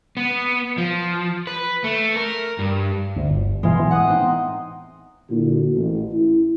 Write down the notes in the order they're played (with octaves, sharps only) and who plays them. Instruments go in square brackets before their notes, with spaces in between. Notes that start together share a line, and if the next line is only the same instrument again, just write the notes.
[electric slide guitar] B3
F3
B4
A3
A#4
G2
[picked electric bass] D2
G1
[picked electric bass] B2 E3 F#3 [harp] G#3 F4
[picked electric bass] A2 E3 B3
[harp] F#5 D#6
C4 D#4
[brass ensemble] A#2 D3 E4 F#4
A1
E4